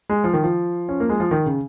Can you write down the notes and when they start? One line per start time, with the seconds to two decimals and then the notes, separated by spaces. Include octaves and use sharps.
0.09 G#3
0.24 F3
0.33 D#3
0.43 F3
0.89 C#4
1.00 A#3
1.09 G#3
1.20 F3
1.31 D#3
1.46 C#3